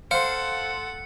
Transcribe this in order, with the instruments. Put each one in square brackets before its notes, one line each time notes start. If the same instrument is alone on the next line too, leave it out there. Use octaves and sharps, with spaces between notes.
[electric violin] A4 F#5 [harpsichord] C5 [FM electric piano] F5 C6 [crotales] C#7